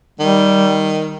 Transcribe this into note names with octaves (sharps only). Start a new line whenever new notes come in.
D#3 G3